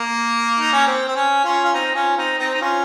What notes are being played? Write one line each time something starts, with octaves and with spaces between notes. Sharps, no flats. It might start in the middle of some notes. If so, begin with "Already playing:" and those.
Already playing: A#3
D#4
C#4
C4
C4
C#4
C#4 F4
F4
C4 D#4
C#4 F4
C4 D#4
C4 D#4
D#4
C#4 F4